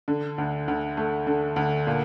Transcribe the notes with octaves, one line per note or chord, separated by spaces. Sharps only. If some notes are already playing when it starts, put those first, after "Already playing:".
D3
D2
D2
A3
D3
D2
A#2